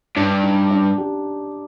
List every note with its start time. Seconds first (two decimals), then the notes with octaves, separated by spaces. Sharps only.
0.16 G2 D4
0.43 D#4
0.71 D4
0.98 G4